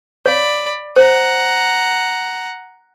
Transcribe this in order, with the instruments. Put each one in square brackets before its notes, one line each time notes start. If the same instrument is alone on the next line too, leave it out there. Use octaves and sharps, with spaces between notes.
[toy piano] C#5 F5 [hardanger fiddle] D5 B5
[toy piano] C5 [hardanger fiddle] F#5 A#5